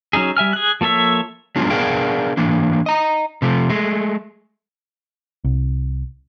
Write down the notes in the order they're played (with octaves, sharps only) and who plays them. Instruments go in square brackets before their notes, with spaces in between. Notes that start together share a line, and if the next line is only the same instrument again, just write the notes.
[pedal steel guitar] F#3 C#4 D#4 G#4
G3 E5 G#5 F6
G#4 F#6
F3 A#3 A4 C#5 E5
[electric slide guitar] F#3 G#3 B3 D4 F4
B3 D4 G#4 A#4 F5 G5
E3 A#3 D4
D#5 A#5
C3 F3 A3
G#3 A3
[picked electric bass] C2